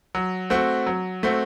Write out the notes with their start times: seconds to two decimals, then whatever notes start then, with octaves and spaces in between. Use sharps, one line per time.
0.15 F#3
0.50 A3 C4 F#4
0.87 F#3
1.23 A3 C4 F#4